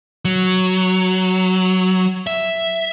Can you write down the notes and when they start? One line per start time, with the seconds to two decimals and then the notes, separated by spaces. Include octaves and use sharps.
0.25 F#3
2.27 E5